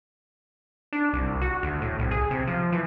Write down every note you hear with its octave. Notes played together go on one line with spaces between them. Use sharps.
D4
C2
F#4
D2
A2
C2
G#4
C3
F3
E3